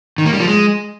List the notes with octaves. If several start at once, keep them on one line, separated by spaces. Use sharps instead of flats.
D#3
A#3
G3
F3
G#3